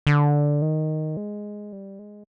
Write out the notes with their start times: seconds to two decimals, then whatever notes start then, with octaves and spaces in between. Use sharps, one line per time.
0.07 D3
0.62 D#3
1.17 G#3
1.73 G3
1.99 G#3